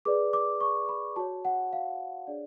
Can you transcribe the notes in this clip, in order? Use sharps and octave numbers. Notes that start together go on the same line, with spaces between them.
G#4 B4 D5 D6
D6
C#6
B5
F#4 C#5 A5
F#5
F5
D4 G#4 C#5 D5